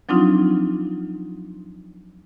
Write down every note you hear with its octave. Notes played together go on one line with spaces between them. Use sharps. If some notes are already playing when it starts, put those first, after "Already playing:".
F3 F#3 C4 D4 D#4 F4